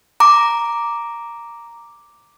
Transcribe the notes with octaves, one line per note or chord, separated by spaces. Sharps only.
A#5 D6